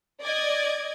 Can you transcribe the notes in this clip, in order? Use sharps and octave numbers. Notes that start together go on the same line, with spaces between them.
D5 D#5 G#6